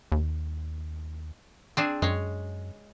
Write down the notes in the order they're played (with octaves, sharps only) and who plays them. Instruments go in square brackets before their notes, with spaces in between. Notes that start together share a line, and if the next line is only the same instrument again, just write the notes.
[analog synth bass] D#2
[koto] C4 D4 G#4
[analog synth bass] F#2 [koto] G#3 C#5